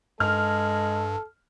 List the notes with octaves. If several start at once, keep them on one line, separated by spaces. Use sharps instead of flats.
G2 G#3 A4 F6